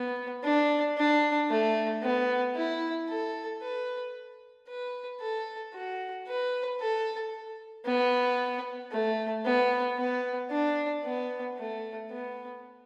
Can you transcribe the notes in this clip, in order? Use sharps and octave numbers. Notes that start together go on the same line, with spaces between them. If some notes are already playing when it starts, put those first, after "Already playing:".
Already playing: B3
D4
D4
A3
B3
E4
A4
B4
B4
A4
F#4
B4
A4
B3
A3
B3
B3
D4
B3
A3
B3